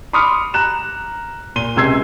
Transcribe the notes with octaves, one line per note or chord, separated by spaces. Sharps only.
B5 C6 D6 D#6 F6 C#7
A#5 F#6 E7
A#2 D#7 G7
C#2 C3 E6 G#6 C7